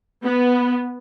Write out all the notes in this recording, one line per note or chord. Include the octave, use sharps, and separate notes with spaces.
B3